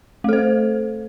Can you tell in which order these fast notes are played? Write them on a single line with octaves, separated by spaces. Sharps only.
A3 A4 C5